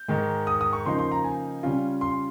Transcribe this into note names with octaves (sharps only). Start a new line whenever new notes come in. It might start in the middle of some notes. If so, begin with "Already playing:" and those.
Already playing: G6
G#2 D#3 G#3
D#6
D#6
C#6
C#3 F3 A#3 D#4 C6
C6
A#5
G#5
C#3 G3 C#4 F4
C6